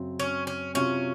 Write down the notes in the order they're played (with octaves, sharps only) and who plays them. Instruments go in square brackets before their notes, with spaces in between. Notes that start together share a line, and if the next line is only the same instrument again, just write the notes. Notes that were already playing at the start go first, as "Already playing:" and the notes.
Already playing: [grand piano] F#2 C#3 F#3 C4
[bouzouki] C#4
C#4
[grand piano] C3 F#3 C4 F4 [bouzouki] C#4